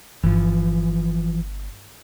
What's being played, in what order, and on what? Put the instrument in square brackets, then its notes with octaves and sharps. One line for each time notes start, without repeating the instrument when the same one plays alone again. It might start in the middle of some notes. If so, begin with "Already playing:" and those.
[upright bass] G1 [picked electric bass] E3 F3